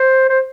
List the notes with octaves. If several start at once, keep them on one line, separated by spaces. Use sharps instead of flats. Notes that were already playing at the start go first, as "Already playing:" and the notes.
Already playing: C5
C5